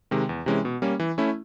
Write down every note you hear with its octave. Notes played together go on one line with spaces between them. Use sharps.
C3 D#3 G#3
E2
C3 E3 G#3 C#4
B2
G3 A#3 C#4
E3
A3 C#4 E4